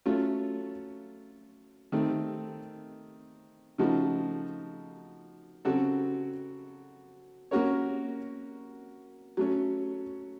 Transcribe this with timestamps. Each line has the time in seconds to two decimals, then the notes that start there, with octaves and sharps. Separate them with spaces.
0.06 F#3 A3 C#4 F4
1.92 D#3 A3 C4
3.78 C#3 F3 A3 D#4 F#4
5.65 C#3 F#3 C4 F#4 A4
7.51 A#3 C#4 F#4 A#4 C#5
9.37 F#3 A3 C#4